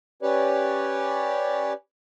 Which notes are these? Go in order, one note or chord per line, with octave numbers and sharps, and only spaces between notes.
C#4 G4 B4 C#5 D5